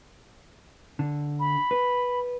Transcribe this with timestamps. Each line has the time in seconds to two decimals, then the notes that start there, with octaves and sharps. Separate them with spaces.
0.99 D3
1.40 B5
1.71 B4